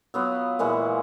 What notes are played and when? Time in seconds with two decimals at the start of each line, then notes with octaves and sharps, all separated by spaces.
0.14 F#3 B3 F4
0.59 A#2 E3 G#3 F#4